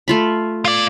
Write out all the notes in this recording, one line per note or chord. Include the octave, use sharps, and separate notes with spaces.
A3 F4 B5
F4 D5